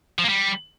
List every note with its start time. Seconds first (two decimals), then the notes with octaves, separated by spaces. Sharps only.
0.19 F3
0.24 A#3
0.29 G3